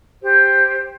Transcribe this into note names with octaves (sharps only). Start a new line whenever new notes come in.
G4 C5